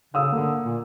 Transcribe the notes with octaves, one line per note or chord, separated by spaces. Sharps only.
C#3 F5 D#6 E6
D3 A#3
A#2